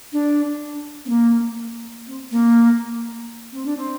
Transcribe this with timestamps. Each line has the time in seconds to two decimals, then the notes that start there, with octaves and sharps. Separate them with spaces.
0.12 D4
1.05 C4
1.09 A#3
2.07 C4
2.31 A#3
3.52 C4
3.65 D4
3.76 C4